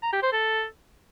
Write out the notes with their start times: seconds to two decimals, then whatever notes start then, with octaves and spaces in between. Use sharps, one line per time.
0.03 A#5
0.13 G4
0.23 C5
0.32 A4